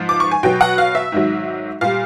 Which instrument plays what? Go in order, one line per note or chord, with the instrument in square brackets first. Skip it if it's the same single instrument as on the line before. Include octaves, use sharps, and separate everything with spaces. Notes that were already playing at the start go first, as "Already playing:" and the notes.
Already playing: [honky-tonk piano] G#2 F3
D6
C#6
G#5
B2 F#3 G5
F#5
F5
E5
G#2 D#3 F#3
A#2 G3 F5